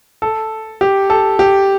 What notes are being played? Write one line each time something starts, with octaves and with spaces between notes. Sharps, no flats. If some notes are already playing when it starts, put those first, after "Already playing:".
A4
G4
A4
G4